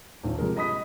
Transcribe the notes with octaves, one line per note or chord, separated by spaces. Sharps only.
D#1 B1
C3 F3 G#3 A#4
D#5 B5 D#6 B6